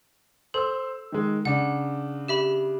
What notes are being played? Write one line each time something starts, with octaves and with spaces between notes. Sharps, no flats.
A4 C5 E6
D#3 G#3
C#3 D4 F#5
G4 E5 B5